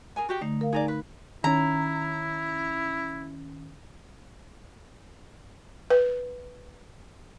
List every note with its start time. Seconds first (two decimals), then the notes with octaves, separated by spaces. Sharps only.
0.16 G#4 A#4 G#5
0.29 F#4 G4 G5
0.41 D3 A3 D#4
0.61 A#4 F5
0.73 D#4 G#4 A#4 D5
0.88 B4
1.44 D#3 C#4 E4 A#5
5.90 B4